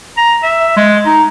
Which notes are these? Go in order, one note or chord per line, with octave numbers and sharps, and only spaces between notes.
A#5
E5
G#3
D#4